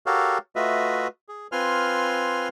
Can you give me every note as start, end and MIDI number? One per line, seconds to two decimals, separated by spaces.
0.06 0.38 66
0.06 0.38 67
0.06 0.38 69
0.06 0.38 70
0.06 0.38 73
0.06 0.38 77
0.56 1.08 57
0.56 1.08 65
0.56 1.08 66
0.56 1.08 71
0.56 1.08 75
0.56 1.08 76
1.29 1.47 68
1.52 2.48 60
1.52 2.48 65
1.52 2.48 71
1.52 2.48 80
1.52 2.48 84
1.52 2.48 89